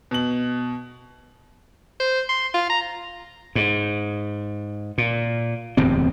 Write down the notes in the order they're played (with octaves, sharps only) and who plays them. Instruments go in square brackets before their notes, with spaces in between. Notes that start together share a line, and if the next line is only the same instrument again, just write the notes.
[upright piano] B2 F#7
[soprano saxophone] C5
C6
F4
A#5
[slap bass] G#2
A#2
D1 E2 C3 C4